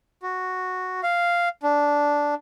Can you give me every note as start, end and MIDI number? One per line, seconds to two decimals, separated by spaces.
0.22 1.01 66
1.03 1.49 77
1.63 2.35 62